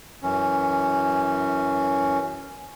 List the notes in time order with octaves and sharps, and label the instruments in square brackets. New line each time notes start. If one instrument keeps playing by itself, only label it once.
[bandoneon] F#2 E3 C#4